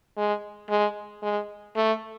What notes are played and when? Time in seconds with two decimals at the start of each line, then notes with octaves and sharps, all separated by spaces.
0.17 G#3
0.70 G#3
1.22 G#3
1.76 A3